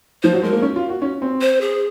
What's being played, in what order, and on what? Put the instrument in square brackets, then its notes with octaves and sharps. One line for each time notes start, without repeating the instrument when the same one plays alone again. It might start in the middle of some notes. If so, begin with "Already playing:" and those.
[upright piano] F3 [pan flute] C5
[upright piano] F#3
[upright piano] G#3 [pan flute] A#4
[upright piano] A#3
C#4
F4
F#4
C#4
C4
[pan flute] C5
G#4